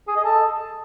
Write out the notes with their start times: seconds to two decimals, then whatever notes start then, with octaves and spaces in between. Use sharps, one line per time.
0.08 G#4
0.16 D#5
0.24 A4